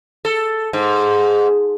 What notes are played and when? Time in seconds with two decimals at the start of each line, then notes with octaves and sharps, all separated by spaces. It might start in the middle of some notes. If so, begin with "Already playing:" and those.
0.25 A4
0.73 G#2